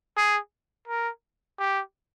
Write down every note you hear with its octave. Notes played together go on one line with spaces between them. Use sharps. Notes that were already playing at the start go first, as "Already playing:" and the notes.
G#4
A#4
G4